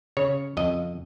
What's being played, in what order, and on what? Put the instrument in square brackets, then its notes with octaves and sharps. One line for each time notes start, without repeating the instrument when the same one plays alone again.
[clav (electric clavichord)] C#3 C#5
F2 D#5